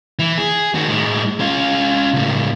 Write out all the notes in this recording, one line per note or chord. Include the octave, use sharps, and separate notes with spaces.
E3
G#4
D#3 F#4
A2 G#3
C#4 F4
C#2 A2